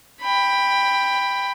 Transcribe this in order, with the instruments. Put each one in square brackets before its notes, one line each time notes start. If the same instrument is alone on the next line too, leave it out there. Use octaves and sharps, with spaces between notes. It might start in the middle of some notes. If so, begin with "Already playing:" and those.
[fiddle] G5 B5